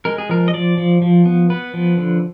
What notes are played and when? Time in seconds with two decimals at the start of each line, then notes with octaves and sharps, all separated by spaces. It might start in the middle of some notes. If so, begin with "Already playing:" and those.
0.05 G#3 A#4
0.18 G#4
0.29 F3 A#4
0.48 D#5
0.54 F3 D5
0.78 F3
1.02 F3
1.25 B3
1.50 B3 B4
1.74 F3
1.97 D3